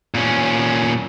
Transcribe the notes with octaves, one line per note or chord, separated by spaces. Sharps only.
A#2 C#4